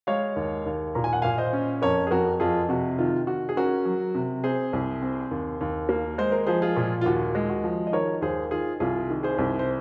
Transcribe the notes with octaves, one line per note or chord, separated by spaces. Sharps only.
G#3 C#5 F5
D#2
D#2
A#2 A#5
G#5
F#5
A#2 F5 G#5
C5 D#5
C#4
F2 A#4 C#5
G#4
F2 F#4 A#4
F2 F4 G#4
C3 F#4
D#3 F4
D#3 F#4
G#4
C#4 F#4 A#4
F#3
C3
C4 G#4 C5
C2
C4
D#2
D#2
A#3
G#3 C5
A#4
F3 G#4 C5
F4 G#4
A#2
F4
D#2 F#4
G#3
F#4
F3
D#5
D#3 A#4 C#5
D#2 G#4 C5
D#3 F4 G#4
C2 F4 G#4
D#3
G#4 C5
C2
C5